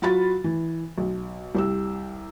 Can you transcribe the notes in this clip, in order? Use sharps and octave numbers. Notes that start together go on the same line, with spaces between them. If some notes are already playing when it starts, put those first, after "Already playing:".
F#3 F4 F#4 B5 A6
E3
B1
C2 G4 E6